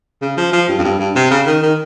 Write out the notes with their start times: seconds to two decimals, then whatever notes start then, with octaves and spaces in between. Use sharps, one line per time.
0.22 C#3
0.37 F3
0.53 F3
0.69 G2
0.78 F2
0.84 G2
1.00 G2
1.16 C3
1.31 C#3
1.47 D#3
1.62 D#3